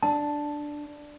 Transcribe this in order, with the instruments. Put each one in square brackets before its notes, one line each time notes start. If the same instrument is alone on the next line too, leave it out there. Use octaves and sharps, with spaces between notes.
[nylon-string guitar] D4 [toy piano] A5